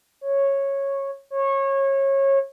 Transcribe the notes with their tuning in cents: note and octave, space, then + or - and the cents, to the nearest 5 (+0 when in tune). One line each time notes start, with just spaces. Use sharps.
C#5 -10
C#5 -25